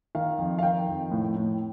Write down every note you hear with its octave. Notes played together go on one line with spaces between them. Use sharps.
D#3 F5
F2
F5
D#3 G5
F2
A2
A2